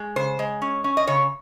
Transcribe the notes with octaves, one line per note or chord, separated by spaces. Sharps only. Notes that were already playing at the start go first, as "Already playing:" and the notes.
Already playing: G#3
C#3 C5
G#3
C#4
C#4
D#5
C#3 C#5